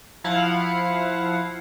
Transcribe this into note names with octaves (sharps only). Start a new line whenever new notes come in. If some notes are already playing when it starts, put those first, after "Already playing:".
F3 E4 F5 F#5